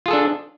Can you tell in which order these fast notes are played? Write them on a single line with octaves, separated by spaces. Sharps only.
F4 G#4 A4 D4